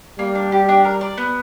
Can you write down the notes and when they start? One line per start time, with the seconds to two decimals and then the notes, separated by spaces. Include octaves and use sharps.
0.19 G3 A#3
0.35 D4
0.52 G4
0.69 D4
0.85 A#4
1.01 D5
1.18 B3